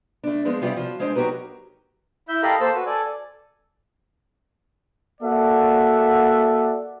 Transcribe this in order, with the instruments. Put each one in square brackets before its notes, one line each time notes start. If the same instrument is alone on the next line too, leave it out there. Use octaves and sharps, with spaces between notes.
[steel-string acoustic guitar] A3 D4
F3 G#3 B3
C3 E3 G3 B3 C#4 F4
F3 F#4
G#3 D4 C5 G#5
F#3 D#4 F#4 G4 A#4 B4
[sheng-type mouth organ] E4 E5 G6
G4 A4 A#4 D#5 F5 B5
A#3 A4 C5 E6
F#4 B4
A4 D5 G#5
[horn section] A#3 F#4 A4 D5 E5 F#5